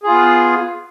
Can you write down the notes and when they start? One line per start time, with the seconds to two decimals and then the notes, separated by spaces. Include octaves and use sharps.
0.03 G#4
0.07 F4
0.10 B3